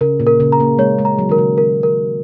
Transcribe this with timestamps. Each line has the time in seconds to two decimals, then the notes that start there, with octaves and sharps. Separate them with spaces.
0.01 C#3 A#4
0.20 A#2
0.27 A#4
0.40 C#3
0.52 A#5
0.60 A#3
0.78 G#3 C#5
0.98 G#3
1.05 A#5
1.18 F#3
1.29 D#3 A#4
1.38 C#3
1.58 A#4
1.83 A#4